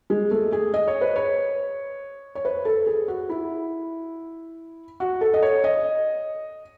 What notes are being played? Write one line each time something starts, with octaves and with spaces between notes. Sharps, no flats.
G#3
A3
G#4
D#5
C#5
B4
C#5
C#5
B4
A4
G#4
F#4
E4
F#4
A4
D#5
C#5
D#5